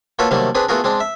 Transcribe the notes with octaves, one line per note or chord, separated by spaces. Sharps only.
A#3 F4 F#4 A4 B4 C#5
C3 D#3 F#3 G3 A3 A#3
C4 D4 G#4 B4
A3 B3 F4 F#4 G#4 A#4
G#3 C4 D4
E5